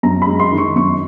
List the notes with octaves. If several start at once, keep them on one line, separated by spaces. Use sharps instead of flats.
F#2 A#5
G#3 B5
C6
D#3
C#6
F#2 C#6